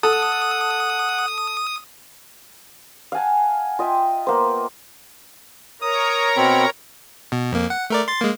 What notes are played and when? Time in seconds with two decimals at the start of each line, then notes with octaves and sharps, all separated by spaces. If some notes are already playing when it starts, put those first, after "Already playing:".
0.03 A4 F#5 D#6
3.12 F5 F#5 G#5 A5
3.79 F4 D#5 E5 G5
4.27 A#3 B3 C5
5.82 A#4 C#5 A#5 D#6
6.37 B2 C4 B5
7.32 B2
7.52 F2 A#3
7.70 F#5
7.90 A3 A#4 D5
8.08 C6 A6
8.21 G#3 A#3